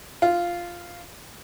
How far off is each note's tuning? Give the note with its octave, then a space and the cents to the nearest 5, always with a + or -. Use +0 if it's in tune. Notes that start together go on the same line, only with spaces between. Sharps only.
F4 -5